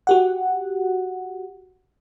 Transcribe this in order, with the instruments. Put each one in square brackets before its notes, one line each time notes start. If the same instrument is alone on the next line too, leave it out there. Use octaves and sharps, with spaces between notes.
[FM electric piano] F#4 G4 F#5